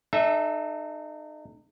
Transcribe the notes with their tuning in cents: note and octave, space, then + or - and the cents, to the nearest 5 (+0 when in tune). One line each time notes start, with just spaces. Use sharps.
D#4 -35 A4 -25 E5 +0